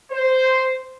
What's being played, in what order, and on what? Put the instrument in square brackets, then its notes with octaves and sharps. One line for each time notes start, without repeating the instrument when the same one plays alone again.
[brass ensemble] C5